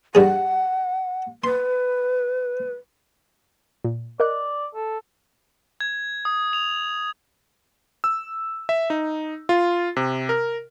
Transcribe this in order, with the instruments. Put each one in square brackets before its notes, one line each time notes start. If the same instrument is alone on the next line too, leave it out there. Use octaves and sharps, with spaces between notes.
[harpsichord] G2 G3 G#4 [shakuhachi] F#5
[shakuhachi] B4 [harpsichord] C6
[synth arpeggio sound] A#2
[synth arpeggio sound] A#4 D#5 F#6 [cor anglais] D5
[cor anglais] A4
[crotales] G#6
D#6
F7
[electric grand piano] E6
E5
D#4
F4
C3
A#4